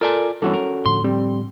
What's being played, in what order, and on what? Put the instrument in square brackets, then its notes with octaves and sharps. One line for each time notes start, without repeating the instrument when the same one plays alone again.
[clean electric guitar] F4 D5 G#5 [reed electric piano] A4 A#4 A#5
[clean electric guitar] E2 G2 E3 [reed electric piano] C#4 F#4 A4
[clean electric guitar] A#4
[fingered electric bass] A2 D3 F3 [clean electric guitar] C6
[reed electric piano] G3 [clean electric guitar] C4